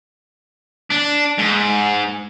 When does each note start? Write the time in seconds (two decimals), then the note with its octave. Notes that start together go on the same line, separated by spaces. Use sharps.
0.92 D4
1.39 G#2